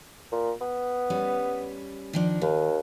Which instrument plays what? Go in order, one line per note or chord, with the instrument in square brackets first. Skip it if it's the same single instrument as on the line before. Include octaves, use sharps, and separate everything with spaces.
[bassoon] A#2
B3
[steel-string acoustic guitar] G3 C#4 B4
D#3 F3 D4
[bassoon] D#2 [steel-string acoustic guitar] D#3